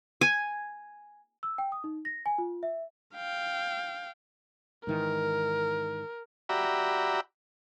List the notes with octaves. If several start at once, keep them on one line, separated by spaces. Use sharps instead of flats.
G#5
E6
G5
D#6
D#4
A#6
G#5
F4
E5
F5 G5
G#2 D#3 E3 A#4
F#4 G4 D5 E5 A#5 B5